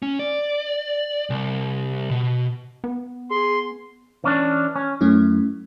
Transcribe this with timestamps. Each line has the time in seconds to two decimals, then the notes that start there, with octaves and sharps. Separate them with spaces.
0.02 C#4
0.19 D5
1.30 C2
2.11 B2
2.84 B3
3.31 G#4 C6
4.24 E3 C#4 D4
4.76 C#4
5.01 F#2 A3 C#4 E4